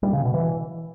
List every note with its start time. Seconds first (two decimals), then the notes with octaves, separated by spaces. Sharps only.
0.03 G3
0.13 C#3
0.23 B2
0.34 E3